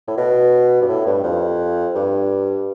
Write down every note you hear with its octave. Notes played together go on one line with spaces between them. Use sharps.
A2
B2
G2
A2
G2
F2
G2